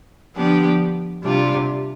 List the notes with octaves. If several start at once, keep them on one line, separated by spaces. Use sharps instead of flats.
D3 F3 B3 D4 G4
C3 G3 D4 F4